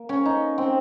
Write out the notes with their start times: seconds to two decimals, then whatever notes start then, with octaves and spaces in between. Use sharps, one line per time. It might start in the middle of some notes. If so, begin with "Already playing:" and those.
Already playing: A#3
0.09 C#4
0.26 D#4
0.58 C4